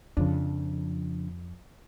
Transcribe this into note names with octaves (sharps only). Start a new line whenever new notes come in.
F2 C#3 F3 D4